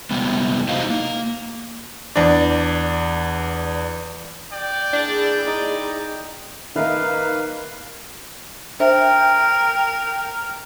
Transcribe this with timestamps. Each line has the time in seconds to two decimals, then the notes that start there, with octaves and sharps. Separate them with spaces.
0.11 C3 G3 G#3 B3
0.69 D#4 E4 F#4 C5 D#5 F5
0.90 A#3
2.16 E2 D4
4.52 D5 G5
4.93 A#3 D4 E4 G#4
5.48 D#4
6.76 D#3 A#3 D#4 A#4 B4 E5 F5
8.80 D4 A#4 C5 E5 G5